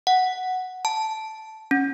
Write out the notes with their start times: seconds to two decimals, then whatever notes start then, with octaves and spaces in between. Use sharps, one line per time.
0.07 F#5
0.85 A5
1.71 C#4